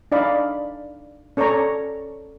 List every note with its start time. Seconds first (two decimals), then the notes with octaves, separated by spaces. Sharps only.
0.12 D4 D#4 D5 D#5 F5 B5
1.37 C#4 A4 C#5 D5 A#5 C#6